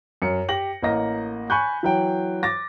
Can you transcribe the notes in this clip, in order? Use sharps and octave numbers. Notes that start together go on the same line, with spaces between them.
F#2 C#7
G4 A#6 F#7
A1 A#3 D#5 A#6
G#5 B5 C#6 F#6 G6
E3 F#3 G5
D6 A6 A#6